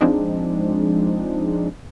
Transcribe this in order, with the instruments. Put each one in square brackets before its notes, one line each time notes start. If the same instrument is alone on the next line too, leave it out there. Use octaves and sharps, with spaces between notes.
[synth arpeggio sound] F3 G#3 C4 D4 D#4